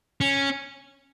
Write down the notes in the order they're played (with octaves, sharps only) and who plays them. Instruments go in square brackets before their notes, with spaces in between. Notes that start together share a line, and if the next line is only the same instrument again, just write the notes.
[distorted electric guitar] C#4